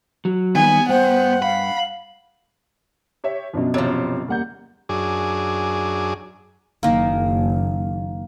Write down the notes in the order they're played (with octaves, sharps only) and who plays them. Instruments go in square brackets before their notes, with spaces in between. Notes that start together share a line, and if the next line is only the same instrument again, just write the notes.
[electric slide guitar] F#3
[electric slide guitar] D#3 G3 [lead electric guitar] B3 [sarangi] G#5
[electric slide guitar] G2 G5 [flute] C5 [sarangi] F#5
[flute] F5 [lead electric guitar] B5
[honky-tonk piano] G4 C#5 E5
[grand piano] F#2 B2 [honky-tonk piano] F3 D4
[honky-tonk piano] A1 C#5 A6 [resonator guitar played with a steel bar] C3 F3
[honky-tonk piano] E2 G3 F#5 [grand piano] A#3 G6
[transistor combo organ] F#2 D4 G#4
[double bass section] F#1 [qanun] D#3 A#3